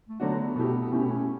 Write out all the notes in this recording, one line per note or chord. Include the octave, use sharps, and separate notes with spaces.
A3
D3 F#3 A3 B3 D4 F#4
B2 A3 E4 G4
B3
B2 A3 C#4 E4 G4
B3
C#4